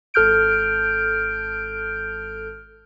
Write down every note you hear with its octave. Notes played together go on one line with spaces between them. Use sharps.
G#1 A4 F6 G6 D7